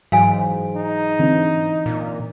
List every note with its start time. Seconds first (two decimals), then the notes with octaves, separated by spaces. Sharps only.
0.12 G#2 E3 F#3 F5 G#5
0.77 D#4
1.19 D3 E3 C4
1.86 A#2